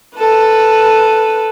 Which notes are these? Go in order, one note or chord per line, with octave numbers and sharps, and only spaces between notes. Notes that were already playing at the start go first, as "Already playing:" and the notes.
A4 B4